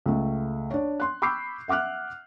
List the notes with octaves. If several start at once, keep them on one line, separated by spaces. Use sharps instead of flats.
C#2 A3
D4 C#5
C6 F#6
B5 C#6 D6 E6 G6 C7
E5 F#5 D6 F6 F#6